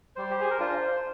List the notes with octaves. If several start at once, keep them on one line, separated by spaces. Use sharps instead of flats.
G3 C5
G4
G#4
A#4
D4 F4 C5